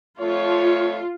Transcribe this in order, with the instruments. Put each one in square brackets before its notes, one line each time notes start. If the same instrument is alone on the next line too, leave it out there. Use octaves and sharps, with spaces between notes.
[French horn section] F2 A3 C#5 [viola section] F4